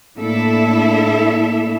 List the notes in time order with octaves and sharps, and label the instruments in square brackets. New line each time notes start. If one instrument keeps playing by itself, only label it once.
[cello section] A2 A#3 D4 E4 A4 E5